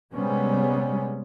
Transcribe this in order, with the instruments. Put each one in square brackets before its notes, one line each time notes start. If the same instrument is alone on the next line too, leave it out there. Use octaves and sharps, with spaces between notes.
[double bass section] C3 G3 G#3 B3 C#4